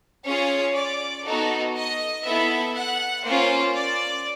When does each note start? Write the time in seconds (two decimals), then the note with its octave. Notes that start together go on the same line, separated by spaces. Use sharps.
0.25 C#4 F4 G#4 C#5
0.75 D5
1.25 B3 D#4 F#4 A4
1.75 D#5
2.24 B3 E4 A4 E5
2.74 F#5
3.24 A#3 C#4 F4 C5
3.75 D5